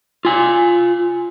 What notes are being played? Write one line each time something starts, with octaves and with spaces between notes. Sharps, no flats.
F4 G#5